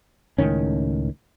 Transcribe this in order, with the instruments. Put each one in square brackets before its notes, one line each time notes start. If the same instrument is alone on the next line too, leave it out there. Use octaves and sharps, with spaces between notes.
[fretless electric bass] C#2 A2 D#3 C#4